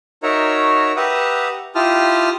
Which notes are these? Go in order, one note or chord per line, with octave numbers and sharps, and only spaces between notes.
D#4 F#4 A#4 C#5 E5 A#5
G4 B4 E5 F#5 A#5 D#6
E4 F4 G4 A5 D#6 F6